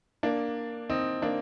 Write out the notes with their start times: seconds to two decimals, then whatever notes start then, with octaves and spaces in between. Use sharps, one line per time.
0.23 A#3 D4
0.90 C4 D#4
1.22 A#3 D4